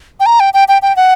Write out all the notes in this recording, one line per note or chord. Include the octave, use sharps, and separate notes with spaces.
G5
A#5
G5
G5
G5
G5
F#5